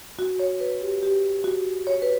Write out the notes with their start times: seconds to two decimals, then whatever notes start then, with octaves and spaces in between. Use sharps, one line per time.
0.19 F#4
0.39 C#5
0.60 B4
0.81 G4
1.03 G4
1.44 F#4
1.87 C#5
2.02 B4